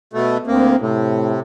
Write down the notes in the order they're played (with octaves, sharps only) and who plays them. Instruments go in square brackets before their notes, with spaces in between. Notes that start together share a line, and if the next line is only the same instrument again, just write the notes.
[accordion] B2 A3
[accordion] D2 A#3 [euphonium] C4
[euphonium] A2 [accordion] C3